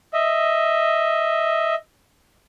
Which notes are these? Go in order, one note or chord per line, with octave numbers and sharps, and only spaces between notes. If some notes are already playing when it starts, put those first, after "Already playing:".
D#5 E5